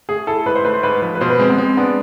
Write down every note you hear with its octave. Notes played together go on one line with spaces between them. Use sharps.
A3 G#4
E4 A4
G#2 B4
C5
A3 B4
C5
G#2 B4
F3 B4
B4
B2 C5
B4
G#3 C4
B3
G#3 C4
B3 D4